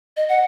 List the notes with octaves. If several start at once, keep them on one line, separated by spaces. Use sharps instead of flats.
D#5
F#5